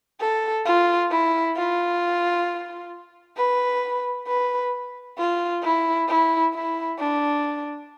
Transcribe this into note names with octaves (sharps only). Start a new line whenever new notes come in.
A4
F4
E4
F4
B4
B4
F4
E4
E4
E4
D4